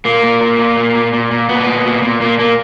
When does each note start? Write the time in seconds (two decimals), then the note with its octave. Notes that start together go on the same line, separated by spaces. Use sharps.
0.05 A#2 A#3
0.23 A#2
0.41 A#2
0.59 A#2
0.77 A#2
0.95 A#2
1.13 A#2
1.31 A#2
1.49 A#2 B3
1.67 A#2
1.85 A#2
2.02 A#2
2.21 A#2 A#3
2.39 A#2 A#3